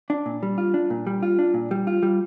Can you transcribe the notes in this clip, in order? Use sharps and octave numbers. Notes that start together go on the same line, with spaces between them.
D4
A#2
G3
F4
D4
A#2
G3
F4
D4
A#2
G3
F4
G3